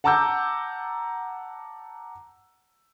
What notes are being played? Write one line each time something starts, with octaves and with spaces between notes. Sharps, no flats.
F#5 A5 A#5 D6 E6 G6